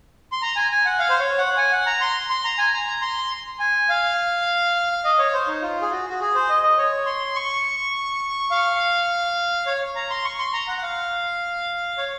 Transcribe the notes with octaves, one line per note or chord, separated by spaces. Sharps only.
C6
A#5
G#5
G#5
F#5
F5
C5
C#5
F#5
G#5
F#5
A#5
C6
C6
A#5
G#5
A#5
C6
G#5
F5
D#5
C#5
C5
D#4
F4
G#4
F#4
F#4
G#4
C5
D#5
D#5
C#5
C6
C#6
F5
C#5
A#5
C6
C#6
C6
A#5
F#5
F#5
F5
C#5